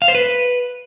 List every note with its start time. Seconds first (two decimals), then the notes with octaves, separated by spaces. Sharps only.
0.02 F5
0.08 C5
0.15 B4